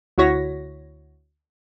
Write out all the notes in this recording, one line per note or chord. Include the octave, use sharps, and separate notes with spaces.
D2 E4 F#4 C#5 A#6 B6